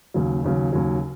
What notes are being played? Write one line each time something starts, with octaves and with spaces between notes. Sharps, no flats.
D#2 C#3 F#3
D#2 C#3 F#3
D#2 C#3 F#3